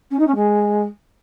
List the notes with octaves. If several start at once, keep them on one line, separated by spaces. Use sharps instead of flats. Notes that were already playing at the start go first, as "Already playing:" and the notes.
C#4
D#4
C#4
G#3